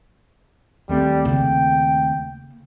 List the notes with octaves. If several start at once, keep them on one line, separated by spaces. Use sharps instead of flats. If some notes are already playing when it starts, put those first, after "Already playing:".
D#2 G3 A3 C4
C#3 A#3 G5